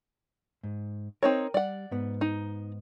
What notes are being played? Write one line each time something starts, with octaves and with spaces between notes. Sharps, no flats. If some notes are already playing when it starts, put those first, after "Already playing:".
G#2
C4 D#4 A#4 C#5
G3 D5 F#5
G#2 B3
D#4